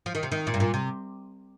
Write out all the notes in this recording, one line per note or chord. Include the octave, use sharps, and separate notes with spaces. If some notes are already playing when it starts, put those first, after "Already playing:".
F3
D#3
C3
D#3
A#2
G2
A#2
C3